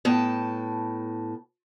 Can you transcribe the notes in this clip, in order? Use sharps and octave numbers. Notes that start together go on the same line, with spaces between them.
A2 B3 G5 A5